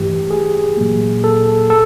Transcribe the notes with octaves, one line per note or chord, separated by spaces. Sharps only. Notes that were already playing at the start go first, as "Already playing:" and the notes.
Already playing: G2 E3 A3 G4
G#4
A#2 F#3 A#3
A4
A4